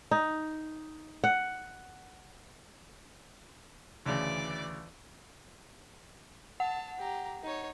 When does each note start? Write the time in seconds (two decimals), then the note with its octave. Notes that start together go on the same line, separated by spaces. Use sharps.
0.11 D#4
1.24 F#5
4.06 D2 C#3 E3 D5 D6
6.60 F#5 A5
6.98 G4 A#5
7.43 D#4 C#5